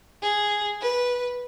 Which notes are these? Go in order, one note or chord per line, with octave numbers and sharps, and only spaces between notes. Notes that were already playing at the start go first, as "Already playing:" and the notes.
G#4
B4